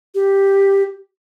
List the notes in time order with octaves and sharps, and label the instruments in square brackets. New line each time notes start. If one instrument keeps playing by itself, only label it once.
[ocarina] G4